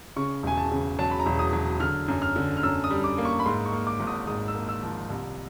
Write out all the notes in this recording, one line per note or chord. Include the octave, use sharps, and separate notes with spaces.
C#3 C#6
E1 G#5
A5
C#3
F#3 A5
B5
A#5
E1
D#6
F#3
D3 F6
F#2
F6
D3
F6
F#2 E6
D#6
G3
D6
A#3
C#6
B5
G#2 C6
C#6
A#3
D6
G#1
D#6
G#2 D#6
E6
A#3
E6
F3
C2